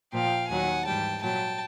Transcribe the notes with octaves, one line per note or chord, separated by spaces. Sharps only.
A#2 F3 F5 G5
D#2 D#3 F#3 F#5 G#5
G#2 E3 G3 G5 A5
A#2 F#3 G5 A5